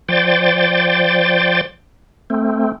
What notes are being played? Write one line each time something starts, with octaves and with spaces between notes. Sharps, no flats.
F3 C5 D5 G5 A6
A3 C4